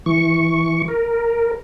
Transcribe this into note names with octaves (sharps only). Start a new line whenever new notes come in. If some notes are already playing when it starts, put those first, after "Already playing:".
E3 C#6
A#4